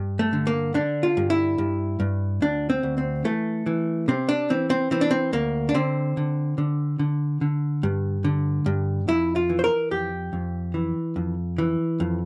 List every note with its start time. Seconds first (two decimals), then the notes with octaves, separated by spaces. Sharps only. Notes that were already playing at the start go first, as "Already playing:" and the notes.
Already playing: G2
0.19 A3
0.33 D3
0.47 A#3
0.74 D3 D4
1.03 F4
1.17 G2
1.30 E4
1.58 G2
2.00 G2
2.42 D2 D4
2.70 C4
2.83 D2
2.98 C4
3.25 E3 A3
3.66 E3
4.08 C3 C4
4.29 D4
4.50 E3 C4
4.70 C4
4.91 E3 C4
5.01 D4
5.11 C4
5.33 D2 A#3
5.69 D4
5.74 D3 C4
6.17 D3
6.58 D3
6.99 D3
7.41 D3
7.83 G2
8.24 D3
8.66 G2
9.08 F2 E4
9.36 F4
9.49 E3
9.59 C5
9.64 A#4
9.91 F2 G4
10.33 F2
10.74 E3
11.16 F2
11.58 E3
12.00 F2